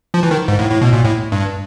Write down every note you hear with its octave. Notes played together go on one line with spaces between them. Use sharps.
F3
E3
D#3
G#2
A2
A2
B2
A#2
A2
G2